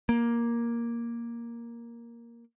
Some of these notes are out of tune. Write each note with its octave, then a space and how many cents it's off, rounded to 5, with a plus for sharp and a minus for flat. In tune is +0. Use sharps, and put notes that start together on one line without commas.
A#3 +5